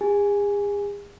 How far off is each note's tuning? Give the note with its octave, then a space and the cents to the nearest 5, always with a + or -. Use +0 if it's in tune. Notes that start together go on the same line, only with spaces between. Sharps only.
G#4 -40 G#5 +0